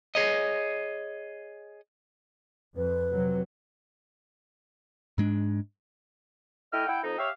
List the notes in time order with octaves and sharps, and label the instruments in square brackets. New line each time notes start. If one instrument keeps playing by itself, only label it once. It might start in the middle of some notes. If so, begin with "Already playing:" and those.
[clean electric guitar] G#4 C#5 D#5
[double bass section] F2 [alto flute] B4
[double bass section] C3 F#3
[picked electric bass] G#2 G#3 D4
[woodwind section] A3 E4 D#5 G5 F6
E4 F#5 G5
F2 D#4
G4 C#5 E5 F5